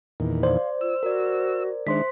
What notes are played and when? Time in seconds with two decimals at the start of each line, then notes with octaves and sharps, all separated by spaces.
0.20 E2 A#2 D#3
0.43 C5 D5 F5
0.81 F4 E6
1.03 F#4 A#4 D5
1.87 D#3 G#3 D4 C5 E5 C6 B6